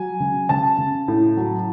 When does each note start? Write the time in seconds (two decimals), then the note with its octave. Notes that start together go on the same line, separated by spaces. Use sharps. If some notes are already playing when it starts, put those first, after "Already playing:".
Already playing: F#3 G#5
0.20 C#3
0.49 C#3 A5
0.78 C#3
1.08 A2
1.37 F#3